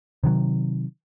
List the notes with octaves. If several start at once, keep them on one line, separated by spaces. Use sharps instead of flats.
C3 D#3 F#3